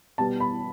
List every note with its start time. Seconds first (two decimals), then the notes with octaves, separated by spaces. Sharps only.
0.18 B2 G3 B3 A5
0.40 B5